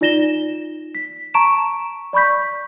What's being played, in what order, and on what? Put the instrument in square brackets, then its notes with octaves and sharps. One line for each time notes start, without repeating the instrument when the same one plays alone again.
[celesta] D#4 F4 D5 A#6 E7 G7
B6
A5 A#5 C#6 D7 E7
D5 B5 C#6 G6 B6